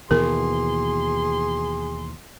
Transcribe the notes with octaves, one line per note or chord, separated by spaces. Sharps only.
D#2 B2 E3 G#4 A#4 C6